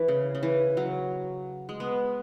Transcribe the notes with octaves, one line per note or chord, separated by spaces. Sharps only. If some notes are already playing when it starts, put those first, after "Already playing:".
Already playing: E3
C#3
C#3
E3
F#3
G#3
B3